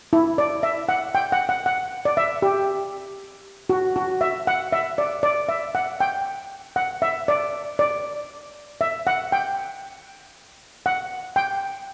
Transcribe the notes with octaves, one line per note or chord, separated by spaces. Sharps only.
E4
D5
E5
F#5
G5
F#5
F#5
F#5
D5
E5
G4
F#4
F#4
E5
F#5
E5
D5
D5
E5
F#5
G5
F#5
E5
D5
D5
E5
F#5
G5
F#5
G5